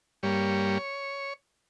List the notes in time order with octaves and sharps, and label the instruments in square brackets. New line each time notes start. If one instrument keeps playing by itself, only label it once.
[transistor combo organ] G2 G3 A#3 C#5